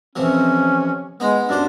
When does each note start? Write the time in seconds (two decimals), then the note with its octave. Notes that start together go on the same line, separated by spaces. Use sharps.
0.16 F2 C3 E3 C#4
1.20 G#3 B3 D#4
1.49 F#2 G3 D4 C5